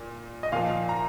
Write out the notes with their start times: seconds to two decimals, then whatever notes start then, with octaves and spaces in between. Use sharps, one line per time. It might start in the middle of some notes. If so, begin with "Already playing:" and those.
Already playing: A#2
0.43 D#5
0.52 A#2 F3 F5
0.89 A#5